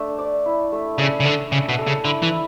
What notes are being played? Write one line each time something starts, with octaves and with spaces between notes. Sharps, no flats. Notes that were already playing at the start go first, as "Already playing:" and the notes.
Already playing: A3 D4
D5
E4
A3
C#3 E5
C#3
D3 E5
C#3 D4
B2
A4
C#3
D3 E4
E3
E4